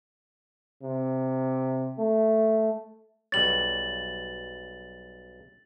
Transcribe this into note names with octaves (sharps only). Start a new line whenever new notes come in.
C3
A3
B1 G3 C#5 A6 F#7